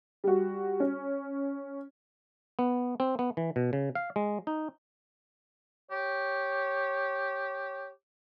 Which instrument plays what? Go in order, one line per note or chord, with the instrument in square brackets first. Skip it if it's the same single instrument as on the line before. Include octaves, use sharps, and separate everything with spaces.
[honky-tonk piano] G3 F#4
C#4
[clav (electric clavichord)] B3
C4
B3
E3
B2
C#3
F5
G#3
D#4
[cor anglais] G4 [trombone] C#5